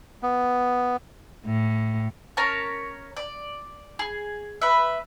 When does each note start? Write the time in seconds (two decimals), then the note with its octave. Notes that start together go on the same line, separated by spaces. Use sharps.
0.23 B3
1.46 A2
2.37 C#4 A#4 C#5 A5
3.17 D5
3.99 G#4
4.61 B4 E5